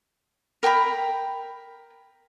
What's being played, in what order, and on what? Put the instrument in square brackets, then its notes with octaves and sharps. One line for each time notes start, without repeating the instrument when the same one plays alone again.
[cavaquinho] A#4 G5 A#5 B5